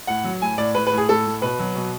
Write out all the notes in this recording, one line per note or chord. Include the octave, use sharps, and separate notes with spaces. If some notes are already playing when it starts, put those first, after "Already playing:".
A2 F#5
F#3
A2 G#5
A2 D5
A2 B4
B4
A2
G#4
A2 A4
A2
B2 B4
F#3
B2